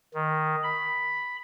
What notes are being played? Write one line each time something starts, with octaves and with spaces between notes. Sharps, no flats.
D#3
B5